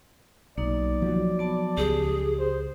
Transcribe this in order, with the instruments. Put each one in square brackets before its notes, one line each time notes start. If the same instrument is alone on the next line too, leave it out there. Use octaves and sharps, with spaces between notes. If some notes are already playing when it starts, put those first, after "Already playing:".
[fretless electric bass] B1 [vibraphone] A#3 D#4 [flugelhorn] D5
[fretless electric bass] F3 F#3
[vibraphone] B3 A5
[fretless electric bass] C#2 [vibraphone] G4 [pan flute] G#4
[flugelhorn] C5